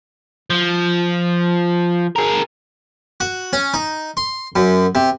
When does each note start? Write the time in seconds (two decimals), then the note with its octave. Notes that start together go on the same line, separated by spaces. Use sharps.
0.50 F3
2.16 G#4 A#4
3.20 F#4
3.53 C#4
3.74 D#4
4.17 C6
4.56 F#2
4.95 C3